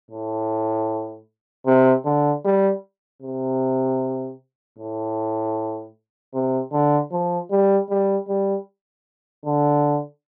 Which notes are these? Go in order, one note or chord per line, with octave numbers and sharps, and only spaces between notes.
A2
C3
D3
G3
C3
A2
C3
D3
F3
G3
G3
G3
D3